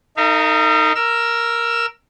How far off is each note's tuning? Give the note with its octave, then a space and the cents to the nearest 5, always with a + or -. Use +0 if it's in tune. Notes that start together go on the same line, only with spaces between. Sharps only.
D#4 +0 A#4 -45 F5 -45
A#4 +0 E6 +20